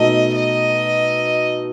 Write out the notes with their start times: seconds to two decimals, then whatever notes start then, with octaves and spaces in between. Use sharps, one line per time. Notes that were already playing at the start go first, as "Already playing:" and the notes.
Already playing: B2 A3 D#4 D#5
0.35 D#5